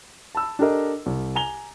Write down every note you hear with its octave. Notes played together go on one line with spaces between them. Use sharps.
A5 B5 E6
D4 G4 A4 A#4 D#5
C2
G#5 A#5 F7 G7